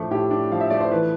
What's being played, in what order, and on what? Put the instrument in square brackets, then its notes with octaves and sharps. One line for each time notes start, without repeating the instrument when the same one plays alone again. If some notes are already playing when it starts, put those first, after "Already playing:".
Already playing: [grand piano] A2 F3 A3 D4
A2 G4
D4
F3 F5
E5
A3 D5
C5
E3 B4